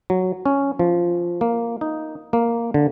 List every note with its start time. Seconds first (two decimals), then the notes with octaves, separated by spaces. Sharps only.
0.10 F#3
0.46 C#4
0.79 F3
1.41 A#3
1.81 D#4
2.33 A#3
2.74 D3